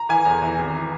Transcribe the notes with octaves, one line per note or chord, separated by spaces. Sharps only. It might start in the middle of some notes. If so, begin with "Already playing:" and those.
Already playing: A#5
E3 G#5
E2 A#5
E3
G#1
E3